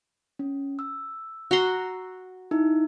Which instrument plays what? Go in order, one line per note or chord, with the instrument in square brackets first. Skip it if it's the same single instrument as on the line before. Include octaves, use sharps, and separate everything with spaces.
[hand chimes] C#4
E6
[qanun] F#4 A#5 C6
[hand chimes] D#4 E4